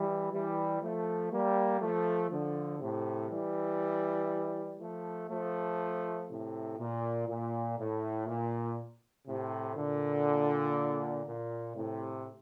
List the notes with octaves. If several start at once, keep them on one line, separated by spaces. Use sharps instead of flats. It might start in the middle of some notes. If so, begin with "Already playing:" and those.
Already playing: E3 G3
E3 G3
F3 A3
G3 A#3
F3 A3
D3 F3
A2 C3
E3 G3
F3 A3
F3 A3
A2 C3
A#2
A#2
A2
A#2
A2 C3
A#2 D3
A#2
A2 C3